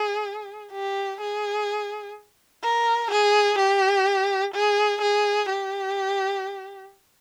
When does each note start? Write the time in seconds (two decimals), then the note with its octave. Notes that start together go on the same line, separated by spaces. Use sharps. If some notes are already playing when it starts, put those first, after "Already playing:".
Already playing: G#4
0.72 G4
1.20 G#4
2.63 A#4
3.11 G#4
3.58 G4
4.54 G#4
5.01 G#4
5.49 G4